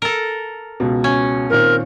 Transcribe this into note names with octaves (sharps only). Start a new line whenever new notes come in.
A4 A#4
C#2 B2
C#4
A#2 D#3 C4 A#4